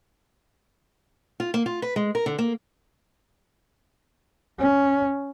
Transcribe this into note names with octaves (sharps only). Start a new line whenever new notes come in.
F4
A#3
F4
B4
G#3
A#4
D3
A#3
C#4